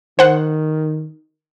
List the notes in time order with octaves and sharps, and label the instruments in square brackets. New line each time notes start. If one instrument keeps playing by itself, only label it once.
[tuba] D#3 [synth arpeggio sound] C5 F#5